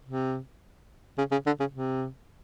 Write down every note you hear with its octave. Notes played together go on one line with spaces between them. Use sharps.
C3
C#3
C#3
D3
C#3
C3